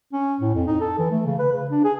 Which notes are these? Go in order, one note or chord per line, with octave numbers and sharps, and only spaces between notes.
C#4
A2
F2
D#4
A4
E3
A3
C#3
B4
C#3
D4
G#4